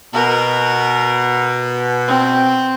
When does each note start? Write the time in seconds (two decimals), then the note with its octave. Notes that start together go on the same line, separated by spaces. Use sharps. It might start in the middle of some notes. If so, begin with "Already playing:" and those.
0.14 B2 A#4
2.08 C4